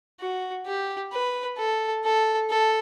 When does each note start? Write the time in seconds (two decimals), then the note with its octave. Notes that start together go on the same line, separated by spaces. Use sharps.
0.20 F#4
0.66 G4
1.12 B4
1.58 A4
2.04 A4
2.50 A4